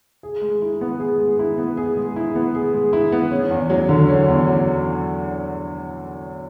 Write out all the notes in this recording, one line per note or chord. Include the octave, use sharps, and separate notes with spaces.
G#4
G#3
E4
B3
G#4
G#3
E4
B3
G#4
G#3
E4
B3
G#4
G#3
E4
B3
C#4
E2
F#3
D3
C#4
E2
F#3